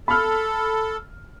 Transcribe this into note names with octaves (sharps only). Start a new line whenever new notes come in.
A4 B5 F6